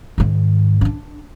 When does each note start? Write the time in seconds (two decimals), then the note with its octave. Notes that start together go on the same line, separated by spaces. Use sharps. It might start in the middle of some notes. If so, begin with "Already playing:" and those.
0.18 G#2 D#3
0.81 C#4 D4